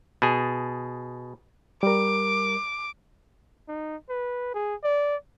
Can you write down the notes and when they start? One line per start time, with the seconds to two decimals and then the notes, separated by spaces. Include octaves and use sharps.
0.22 B2 G#4
1.83 G3 A#4 D6
3.68 D#4
4.09 B4
4.54 G#4
4.84 D5